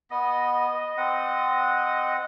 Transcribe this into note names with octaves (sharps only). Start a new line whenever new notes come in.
B3 D#5
C4 F#5